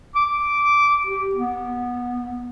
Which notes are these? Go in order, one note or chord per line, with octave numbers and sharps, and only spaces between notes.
D6
G4
B3